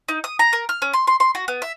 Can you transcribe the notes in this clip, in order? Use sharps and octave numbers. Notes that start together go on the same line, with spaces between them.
D#4
D#6
A#5
A#4
F6
C#4
C6
C6
C6
F#4
B3
E5